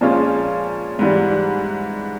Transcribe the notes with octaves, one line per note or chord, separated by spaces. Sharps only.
A#2 F3 G#3 C#4 F4
G#2 E3 G3